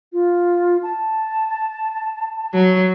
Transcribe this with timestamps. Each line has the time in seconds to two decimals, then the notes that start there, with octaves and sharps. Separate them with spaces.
0.13 F4
0.83 A5
2.53 F#3